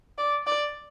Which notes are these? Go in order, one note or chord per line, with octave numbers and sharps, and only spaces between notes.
D5
D5